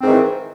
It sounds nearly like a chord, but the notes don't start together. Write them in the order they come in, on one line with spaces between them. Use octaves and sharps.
C4 G#2 D#3 E3